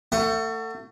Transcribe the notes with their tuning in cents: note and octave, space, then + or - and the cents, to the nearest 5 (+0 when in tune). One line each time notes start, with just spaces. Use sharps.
A3 +30 F#5 +0